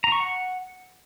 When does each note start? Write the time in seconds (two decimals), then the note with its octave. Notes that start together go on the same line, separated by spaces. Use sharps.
0.04 A#5
0.12 C#6
0.20 F#5